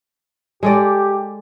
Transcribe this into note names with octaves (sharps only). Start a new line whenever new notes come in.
G#3 G4 A4 D5